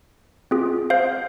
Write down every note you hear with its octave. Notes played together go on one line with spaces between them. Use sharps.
C4 F4 G#4
C5 F5